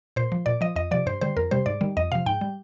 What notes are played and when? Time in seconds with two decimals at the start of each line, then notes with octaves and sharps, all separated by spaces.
0.16 A#2 C5
0.32 F3
0.46 A#2 D5
0.61 F3 D#5
0.76 F2 D#5
0.91 C3 F3 D5
1.06 G2 C5
1.21 D3 G3 C5
1.37 F2 A#4
1.51 C3 G3 C5
1.66 G#2 D5
1.81 D#3 G3
1.97 F2 D#5
2.12 C3 F3 F5
2.26 G#2 G5
2.41 G3